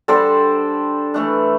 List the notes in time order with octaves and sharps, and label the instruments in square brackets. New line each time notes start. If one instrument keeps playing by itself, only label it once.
[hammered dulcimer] D3 G3 [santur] A4 C5 D5
[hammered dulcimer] E3 A3 D4